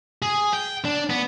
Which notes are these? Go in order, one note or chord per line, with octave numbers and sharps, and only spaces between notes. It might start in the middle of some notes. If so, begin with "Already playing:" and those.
G#4
G5
D4
B3